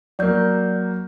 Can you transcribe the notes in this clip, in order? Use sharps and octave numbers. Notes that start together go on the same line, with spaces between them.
F#3 A#3 D5 G6